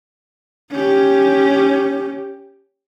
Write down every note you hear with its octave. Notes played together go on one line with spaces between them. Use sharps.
C#4 G4